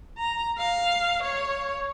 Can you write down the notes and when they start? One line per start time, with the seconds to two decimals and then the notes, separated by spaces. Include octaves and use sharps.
0.18 A#5
0.58 F5
1.23 C#5